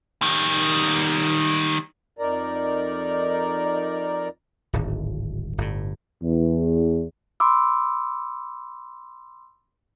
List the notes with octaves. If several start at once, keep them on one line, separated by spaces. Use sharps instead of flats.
D#3 G3
F2 D#4 A#4 D5 A#5
D1 G#1
G1 A2
E2
B5 C6 D6 E6